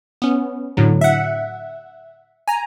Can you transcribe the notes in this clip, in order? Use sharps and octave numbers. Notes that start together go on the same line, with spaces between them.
B3 C#4
A2 D3 F#3
E5 F#5
G#5 A#5